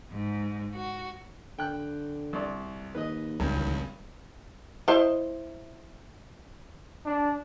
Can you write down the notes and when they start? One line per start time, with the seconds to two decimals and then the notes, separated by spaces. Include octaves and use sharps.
0.11 G#2
0.76 F#4
1.59 D3 G5 F#6
2.33 C2 D5
2.95 D#2 B4 D#5
3.40 G#1 C#2 G2
4.88 E4 C5 D#5
7.05 D4